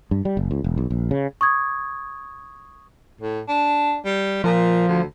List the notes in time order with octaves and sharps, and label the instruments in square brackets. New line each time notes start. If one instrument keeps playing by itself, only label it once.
[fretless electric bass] G2
G3
F#1
C#2
E1
B1
A#1
C#3
[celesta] C#6 D#6 G#6
[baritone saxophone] A2
D4
G3
[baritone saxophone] A#2 [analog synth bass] F3
[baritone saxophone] D2